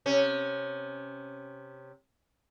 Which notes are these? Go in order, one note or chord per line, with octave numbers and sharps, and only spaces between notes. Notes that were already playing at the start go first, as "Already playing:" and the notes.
C3 C#4